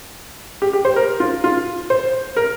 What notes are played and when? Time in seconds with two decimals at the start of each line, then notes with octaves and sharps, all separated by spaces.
0.62 G4
0.73 G4
0.85 C5
0.96 A#4
1.20 F4
1.44 F4
1.90 C5
2.37 A#4